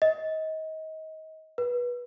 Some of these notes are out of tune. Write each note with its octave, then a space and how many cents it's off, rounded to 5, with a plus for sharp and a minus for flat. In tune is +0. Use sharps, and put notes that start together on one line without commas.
D#5 +30
B4 -20